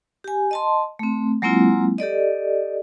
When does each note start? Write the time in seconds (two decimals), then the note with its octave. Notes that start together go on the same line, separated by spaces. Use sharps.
0.24 G4 G#5
0.51 D#5 A5 C6
0.99 A3 C4
1.42 F#3 G#3 A#3 C4 E4 F4
1.98 G4 A4 D5 D#5